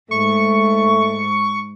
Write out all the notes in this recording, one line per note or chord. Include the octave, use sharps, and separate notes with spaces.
G#2 A3 C#6